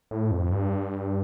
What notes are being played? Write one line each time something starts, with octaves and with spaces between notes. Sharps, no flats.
A2
F2
G2